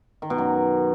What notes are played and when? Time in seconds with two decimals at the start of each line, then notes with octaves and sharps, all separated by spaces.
0.22 D#3
0.30 B2
0.38 F#2